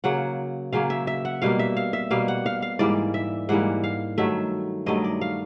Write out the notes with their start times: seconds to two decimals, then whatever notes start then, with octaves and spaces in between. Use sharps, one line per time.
0.04 C#3 F#3 A#3 F#5
0.73 C#3 F#3 A#3 F5
0.90 E5
1.07 E5
1.25 F#5
1.42 B2 G3 A#3 F5
1.59 E5
1.77 F5
1.93 E5
2.11 B2 G3 A#3 F5
2.28 F#5
2.46 F5
2.62 F5
2.79 G#2 E3 G3 A#3 D5
3.14 E5
3.49 G#2 E3 G3 A#3 F#5
3.84 F5
4.18 G2 D#3 F#3 A3 E5
4.86 G2 D#3 F#3 A3 D#5
5.04 D5
5.21 F5